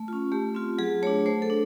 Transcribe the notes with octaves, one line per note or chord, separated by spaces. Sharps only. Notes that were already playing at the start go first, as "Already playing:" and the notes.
Already playing: A3
C#4 F4
A3 G4
C4 F4
F#3 G#4
A3 D4 C#5
A3 C5
A4
D4